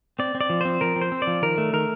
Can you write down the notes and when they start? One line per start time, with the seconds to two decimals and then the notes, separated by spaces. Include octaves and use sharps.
0.19 C4 D5
0.35 C4
0.41 D5
0.50 F3
0.61 C4 C5
0.81 F3 A#4
0.96 C4
1.01 C5
1.12 C4
1.22 D5
1.27 F3
1.42 D#3 A#4
1.58 A3
1.73 D#3 A#4